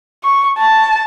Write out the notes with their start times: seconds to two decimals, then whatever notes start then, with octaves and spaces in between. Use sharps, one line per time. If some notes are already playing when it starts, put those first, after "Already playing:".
0.24 C#6
0.59 A5